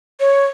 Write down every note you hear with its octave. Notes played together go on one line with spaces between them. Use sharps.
C#5